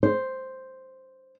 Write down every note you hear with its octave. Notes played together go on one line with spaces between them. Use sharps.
C5